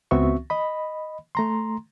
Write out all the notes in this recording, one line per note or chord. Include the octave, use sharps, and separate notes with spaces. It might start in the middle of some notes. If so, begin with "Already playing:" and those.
C#2 B3 C4 F#4 E5 C#6
D#5 B5
A3 A#5 C6